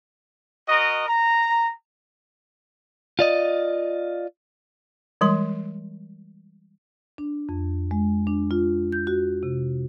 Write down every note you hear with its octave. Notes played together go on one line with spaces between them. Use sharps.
F#4 A#4 D#5
A#5
F4 D5 D#5
E3 G3 G#3 C6
D4
F2
G#3
D4
F4
G6
F#4
C3